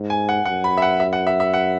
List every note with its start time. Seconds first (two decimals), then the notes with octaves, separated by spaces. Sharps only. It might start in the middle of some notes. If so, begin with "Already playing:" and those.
Already playing: G#2
0.10 G#5
0.29 F#5
0.45 F#2 F#5
0.64 B5
0.77 E5
0.82 F#5
1.00 E5
1.13 F#5
1.27 E5
1.40 E5
1.54 F#5